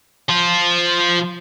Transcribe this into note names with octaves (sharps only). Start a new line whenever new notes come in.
F3 F4